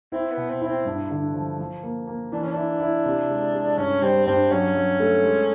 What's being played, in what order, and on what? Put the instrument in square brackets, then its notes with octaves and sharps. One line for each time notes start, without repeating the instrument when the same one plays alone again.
[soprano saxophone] C4 [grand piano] E4
[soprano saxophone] B3
[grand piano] B2
[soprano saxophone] C4
[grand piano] E4
[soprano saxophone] C4
[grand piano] G2
D3
F3
F3
A#3
A#3
[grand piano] E3 [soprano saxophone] D4
[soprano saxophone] C#4
[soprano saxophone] D4 [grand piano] E4
[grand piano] E4
C3
G#3
G#3
[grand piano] G2 [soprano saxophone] C#4
[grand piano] G3 [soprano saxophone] C4
[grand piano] G2 [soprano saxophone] C4
[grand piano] F#3 [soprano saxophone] C#4
[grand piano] F#3
A3
G#3